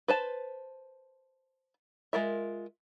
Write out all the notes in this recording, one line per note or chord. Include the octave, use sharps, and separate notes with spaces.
B4 C5 A5
G#3 F4 A#4 E5